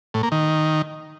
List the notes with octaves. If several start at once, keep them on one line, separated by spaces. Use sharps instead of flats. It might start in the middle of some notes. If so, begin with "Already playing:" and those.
A2
A#3
D#3